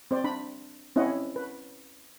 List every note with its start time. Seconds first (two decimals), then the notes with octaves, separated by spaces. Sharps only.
0.11 C4 C5 D5
0.24 D4 B5
0.96 C4 C#4 E4 D#5 F#5
1.36 B4